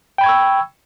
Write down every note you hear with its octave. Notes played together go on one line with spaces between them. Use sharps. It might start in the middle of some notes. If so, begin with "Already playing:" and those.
G5 B5 C#6 E6 G#6